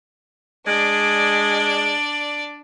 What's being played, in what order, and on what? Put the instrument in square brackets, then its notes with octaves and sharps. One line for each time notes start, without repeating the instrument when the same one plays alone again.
[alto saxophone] G#3 [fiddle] D4 D5